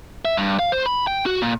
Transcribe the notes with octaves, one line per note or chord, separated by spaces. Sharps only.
E5
G2
F5
C5
B5
G5
F#4
A#2